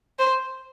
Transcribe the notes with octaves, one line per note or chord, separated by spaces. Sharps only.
C5